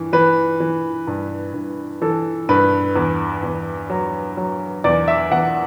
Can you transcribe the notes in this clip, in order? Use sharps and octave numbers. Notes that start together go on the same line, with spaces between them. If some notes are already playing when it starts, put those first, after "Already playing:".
Already playing: G2 E3
E3 B4
E3
G2
G2
E3 A4
G2 B4
E2
E2
F#3
F#3
E2 D5
E5
E2 F#5